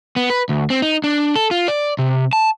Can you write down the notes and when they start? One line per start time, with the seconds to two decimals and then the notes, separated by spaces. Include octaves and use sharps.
0.16 B3
0.30 B4
0.49 D2
0.70 C4
0.82 D#4
1.04 D4
1.36 A4
1.51 F4
1.68 D5
1.99 C3
2.33 A5